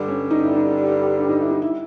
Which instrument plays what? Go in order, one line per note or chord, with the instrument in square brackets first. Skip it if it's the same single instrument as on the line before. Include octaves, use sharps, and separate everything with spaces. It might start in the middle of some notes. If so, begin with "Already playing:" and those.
Already playing: [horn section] G2 D3 G3 [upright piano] D4
[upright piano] C#4
D#4
E4
D#4
D4
D#4
E4
D#4
E4